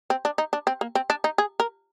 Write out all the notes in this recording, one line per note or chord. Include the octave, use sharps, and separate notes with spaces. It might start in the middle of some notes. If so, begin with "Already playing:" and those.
C4
D4
D#4
D4
C4
A#3
C4
D4
D#4
G#4
A#4